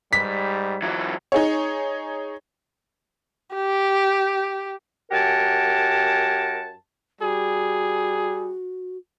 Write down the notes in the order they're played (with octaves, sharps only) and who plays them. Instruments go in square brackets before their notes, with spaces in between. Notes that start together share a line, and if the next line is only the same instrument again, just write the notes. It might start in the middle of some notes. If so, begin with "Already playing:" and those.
[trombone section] G#2 G3 [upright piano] B6
[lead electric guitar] E3 F#3
[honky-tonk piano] D#4 G#4 C#5
[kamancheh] G4
[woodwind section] F#2 G4 A#4 F#5 G#5 A5
[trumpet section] G3 G#4 [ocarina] F#4